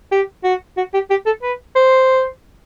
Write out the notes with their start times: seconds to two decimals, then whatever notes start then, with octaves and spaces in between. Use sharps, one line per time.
0.12 G4
0.44 F#4
0.77 F#4
0.94 G4
1.10 G4
1.26 A4
1.42 B4
1.76 C5